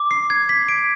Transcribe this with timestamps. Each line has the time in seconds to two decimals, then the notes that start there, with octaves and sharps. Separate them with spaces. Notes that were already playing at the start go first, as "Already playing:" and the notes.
Already playing: D6
0.11 C7
0.30 G#6
0.49 B6
0.69 D7